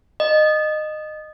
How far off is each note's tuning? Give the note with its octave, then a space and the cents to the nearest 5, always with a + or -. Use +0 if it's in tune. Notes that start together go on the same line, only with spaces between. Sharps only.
D#5 -20